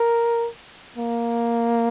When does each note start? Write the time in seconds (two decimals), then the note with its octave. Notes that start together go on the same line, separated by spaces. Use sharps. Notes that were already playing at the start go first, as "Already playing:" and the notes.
Already playing: A#4
0.96 A#3